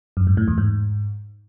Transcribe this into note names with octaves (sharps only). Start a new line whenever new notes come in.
F#2
G#2
A2
E2
G#2